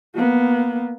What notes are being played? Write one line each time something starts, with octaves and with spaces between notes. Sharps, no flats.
A#3 B3